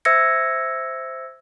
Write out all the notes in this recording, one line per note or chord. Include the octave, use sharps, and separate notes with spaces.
C5 E5 E6 G#6 A#6 C#7